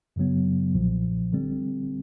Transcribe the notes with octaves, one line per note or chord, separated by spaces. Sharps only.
F#2 C#3 F#3 B3
B1 A#2 F3
D3 G3 C4